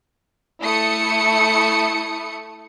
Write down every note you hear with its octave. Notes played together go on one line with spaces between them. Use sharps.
A3 E4 D#6 C#7